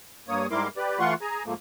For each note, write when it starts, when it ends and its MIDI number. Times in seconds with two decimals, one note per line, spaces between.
0.28 0.47 43
0.28 0.47 58
0.28 0.47 73
0.28 0.47 87
0.51 0.68 44
0.51 0.68 55
0.51 0.68 64
0.51 0.68 70
0.51 0.68 84
0.51 0.68 86
0.77 0.99 67
0.77 0.99 71
0.77 0.99 74
0.99 1.14 52
0.99 1.14 57
0.99 1.14 65
0.99 1.14 78
0.99 1.14 84
0.99 1.14 85
1.21 1.43 68
1.21 1.43 80
1.21 1.43 82
1.46 1.54 44
1.46 1.54 53
1.46 1.54 57
1.46 1.54 58